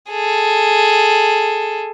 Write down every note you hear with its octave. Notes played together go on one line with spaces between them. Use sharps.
G#4 A4